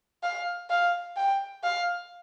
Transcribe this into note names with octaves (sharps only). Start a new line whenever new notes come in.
F5
F5
G5
F5